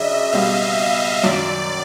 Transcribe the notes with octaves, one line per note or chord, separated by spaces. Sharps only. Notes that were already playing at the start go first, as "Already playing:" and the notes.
Already playing: C#3 F#3 D4 D#5 E5
B2 G3 C4 F5
E5
F#2 D#3 F#3 D5